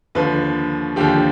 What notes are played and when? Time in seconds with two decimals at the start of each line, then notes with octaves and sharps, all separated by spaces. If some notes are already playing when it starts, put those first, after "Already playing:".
0.15 D#2 D3 F3 B4
0.96 D#2 D3 F3 G4